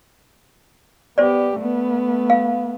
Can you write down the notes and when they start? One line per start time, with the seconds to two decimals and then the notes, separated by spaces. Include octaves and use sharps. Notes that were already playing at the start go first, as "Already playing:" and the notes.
1.18 B3 G4 C5 D5
1.58 A3 B3
2.30 F5